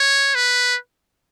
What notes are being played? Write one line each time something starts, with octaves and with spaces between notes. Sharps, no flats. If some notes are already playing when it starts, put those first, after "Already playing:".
Already playing: C#5
B4